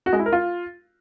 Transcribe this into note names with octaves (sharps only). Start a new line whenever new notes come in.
F#4
G#3
E4
A#4
F4